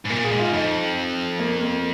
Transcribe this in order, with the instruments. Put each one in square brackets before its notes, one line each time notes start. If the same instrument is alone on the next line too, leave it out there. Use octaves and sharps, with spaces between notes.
[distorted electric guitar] G#2
[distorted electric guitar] A#2 [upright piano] A#3
[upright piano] G#4
[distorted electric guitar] G#2
[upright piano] F4
[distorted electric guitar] F2 [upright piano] D#4
[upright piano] A#3
A#3